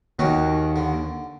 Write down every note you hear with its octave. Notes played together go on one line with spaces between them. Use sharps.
D#2 D#3 C#4 F#4
D3